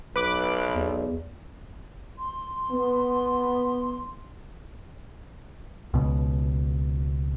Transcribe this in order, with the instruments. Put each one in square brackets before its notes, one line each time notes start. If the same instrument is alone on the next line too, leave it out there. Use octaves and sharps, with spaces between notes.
[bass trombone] B1 [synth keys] B4 D6 F#6
[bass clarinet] E2
[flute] C6
[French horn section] B3
[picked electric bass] C#2 B2